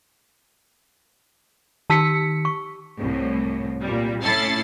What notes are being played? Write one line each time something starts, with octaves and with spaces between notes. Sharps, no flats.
D#3 G4 A5 E6 B6 C#7
C#6
C2 A2
A#2 G3
A2 C#4 E4 A4 A6 C7